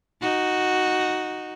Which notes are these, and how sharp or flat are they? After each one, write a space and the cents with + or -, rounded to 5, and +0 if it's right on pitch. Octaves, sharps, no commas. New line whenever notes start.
D#4 +0 F#4 +0